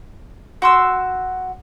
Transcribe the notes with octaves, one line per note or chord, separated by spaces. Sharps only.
F#4 C6 E6